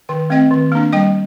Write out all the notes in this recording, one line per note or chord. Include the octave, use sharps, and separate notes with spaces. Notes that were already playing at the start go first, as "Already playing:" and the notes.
D#3 G5
A3 C4 D#5 G5
D#3
A#3 D4
G3 D#5 G5